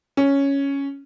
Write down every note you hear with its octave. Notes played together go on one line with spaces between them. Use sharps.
C#4